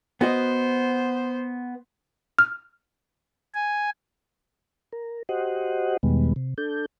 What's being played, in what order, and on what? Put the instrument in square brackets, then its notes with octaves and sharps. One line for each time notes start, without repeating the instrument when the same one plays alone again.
[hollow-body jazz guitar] B3 F#4 D#5 [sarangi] C5
[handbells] F6
[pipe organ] G#5
[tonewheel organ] A#4
F#4 G4 C5 D#5 F#5
E2 B2 D#3 G3 G#3 B3
C3
D4 A4 G6